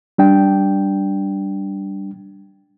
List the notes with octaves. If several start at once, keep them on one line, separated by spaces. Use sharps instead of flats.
G3 D4 G5